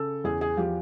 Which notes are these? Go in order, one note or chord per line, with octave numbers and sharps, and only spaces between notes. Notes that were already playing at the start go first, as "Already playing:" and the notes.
Already playing: C#3 A4
E2 G#4
G#4
F3 G4